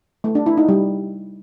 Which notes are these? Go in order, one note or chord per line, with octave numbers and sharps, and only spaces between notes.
A3
D4
E4
D#4
G3